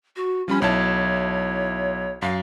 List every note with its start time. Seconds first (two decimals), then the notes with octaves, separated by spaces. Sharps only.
0.16 F#4
0.48 F3 G3 C#4 B5
0.62 B1 E4 C#5 A5
2.22 F#2 F5